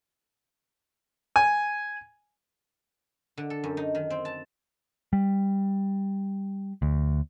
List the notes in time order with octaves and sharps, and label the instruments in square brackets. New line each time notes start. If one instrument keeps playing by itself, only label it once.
[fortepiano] G#5
[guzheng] D3
A4
F#2
D#4
D#3
C4
A5
[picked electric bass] G3
D2